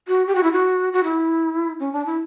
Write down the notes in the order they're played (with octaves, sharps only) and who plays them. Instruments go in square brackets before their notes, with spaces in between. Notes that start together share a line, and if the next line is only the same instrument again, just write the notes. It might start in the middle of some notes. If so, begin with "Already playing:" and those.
[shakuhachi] F#4
G4
F#4
E4
F#4
F#4
E4
C#4
D4
E4